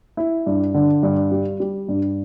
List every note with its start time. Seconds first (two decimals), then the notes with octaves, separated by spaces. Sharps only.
0.17 E4
0.46 G2
0.74 D3
1.03 G2
1.32 G3
1.60 G3
1.89 G2